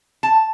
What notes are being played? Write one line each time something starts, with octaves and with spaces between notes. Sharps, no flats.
A5